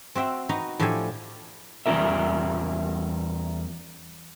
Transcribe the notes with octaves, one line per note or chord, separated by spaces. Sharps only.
C4 F#4 E5 G5
D#4 F#4 B4 A#5
A2 F3 D4 G4 A4 G#5
E2 G3 C#4 F4 A#4 E5